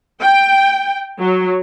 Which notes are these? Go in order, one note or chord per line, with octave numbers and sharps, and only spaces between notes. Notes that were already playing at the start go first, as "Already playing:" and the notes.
G5
F#3